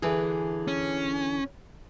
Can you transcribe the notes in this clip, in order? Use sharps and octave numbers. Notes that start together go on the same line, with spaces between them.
D3 E3 G#4 B4
C#4